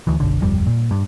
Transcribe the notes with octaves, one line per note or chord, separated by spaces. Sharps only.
D2 E3
F#1 B1 D3
D1 G1 F2 G3
A#2
G2